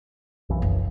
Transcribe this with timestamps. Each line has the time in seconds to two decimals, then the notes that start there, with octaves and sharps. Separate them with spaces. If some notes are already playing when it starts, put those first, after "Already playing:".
0.50 B1 F#2 E3
0.62 F#1